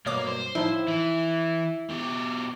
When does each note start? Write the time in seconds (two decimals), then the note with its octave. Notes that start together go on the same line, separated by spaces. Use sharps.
0.06 G2 B2 F#3 G3 A#3 C#5 D6
0.27 C5
0.55 A2 F3 D#4 E4
0.87 E3 E5
1.89 B2 G4